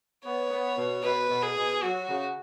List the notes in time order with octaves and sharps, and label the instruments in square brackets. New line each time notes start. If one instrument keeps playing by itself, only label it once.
[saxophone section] B3 [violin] C#5
[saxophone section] B3
B2
[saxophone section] B2 [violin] B4
[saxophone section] B2
[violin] G#4
[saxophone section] B2
[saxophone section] F#3 [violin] F#4
[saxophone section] C#3